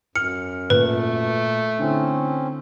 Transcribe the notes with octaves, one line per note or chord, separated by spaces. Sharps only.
F#2 F6 C#7
A#2 A3 B4
D3 C4 C#4 E4